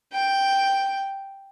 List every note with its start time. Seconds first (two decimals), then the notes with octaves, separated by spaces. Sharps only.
0.13 G5